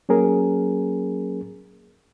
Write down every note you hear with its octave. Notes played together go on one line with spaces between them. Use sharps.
F#3 A#3 C#4 G#4 A#4